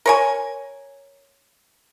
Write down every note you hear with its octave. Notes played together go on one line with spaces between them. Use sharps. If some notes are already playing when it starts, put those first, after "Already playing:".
A#4 C#5 G#5